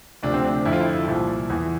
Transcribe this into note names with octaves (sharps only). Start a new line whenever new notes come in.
D2 C3 F3 D4
C4
D4
F2 D3 F3 E4
F4
E4
C2 A#2 F3
E2 E3